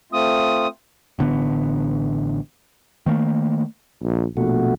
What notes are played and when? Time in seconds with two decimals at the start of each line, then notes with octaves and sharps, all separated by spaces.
0.12 A3 C4 F4 D#6
1.19 A1 D3 B3
3.06 D#3 A3 A#3
4.03 A#1
4.37 A#1 B2 A3 F#4